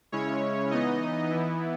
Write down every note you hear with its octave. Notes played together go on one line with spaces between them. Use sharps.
C#3 G#3 C#4 E4 C#5
E3 B3 D#4 D#5
E3 B3 E4